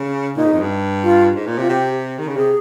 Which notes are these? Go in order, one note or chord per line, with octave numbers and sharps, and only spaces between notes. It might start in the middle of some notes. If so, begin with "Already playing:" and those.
Already playing: C#3
A#2 D#4
G#2
F2
G2
F4
G#2
A#2
C3 F4
C3 G4
D#3
C#3
C3 G#4